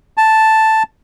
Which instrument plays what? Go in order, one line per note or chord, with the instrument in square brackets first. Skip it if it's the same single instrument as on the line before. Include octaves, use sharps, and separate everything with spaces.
[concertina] A5